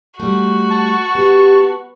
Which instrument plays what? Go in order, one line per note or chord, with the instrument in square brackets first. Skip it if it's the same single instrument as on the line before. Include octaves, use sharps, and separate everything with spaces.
[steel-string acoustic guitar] G3 A3 [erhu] F#4
[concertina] A5 C#6
[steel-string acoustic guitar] B3 [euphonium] G4